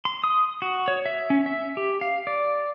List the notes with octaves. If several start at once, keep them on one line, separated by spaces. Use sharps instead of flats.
C6
D#6
F#4
C#5
E5
C#4
E5
G4
F5
D5